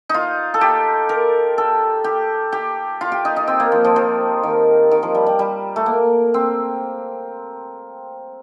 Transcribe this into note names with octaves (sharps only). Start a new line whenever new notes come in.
D#4 F4
A4
G4
A#4
A4
G4
G4
F4
G4
D#4
D#4
C4
A#3
F3
F3
F3
D#3
D#3
F3
G3
G3
G3
A3
A#3
C4